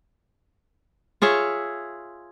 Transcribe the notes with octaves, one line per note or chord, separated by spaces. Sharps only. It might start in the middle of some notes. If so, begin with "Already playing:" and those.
F4 G#4 C#5 E5